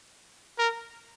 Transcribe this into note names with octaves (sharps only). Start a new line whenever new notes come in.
A#4